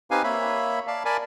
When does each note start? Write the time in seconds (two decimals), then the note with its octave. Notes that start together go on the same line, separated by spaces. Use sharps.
0.11 C4 D#4 G4 B4 F5 G#5
0.24 A#3 C#5 E5 B5
0.87 D5 F5 A5
1.05 A#4 D5 G#5 A5 B5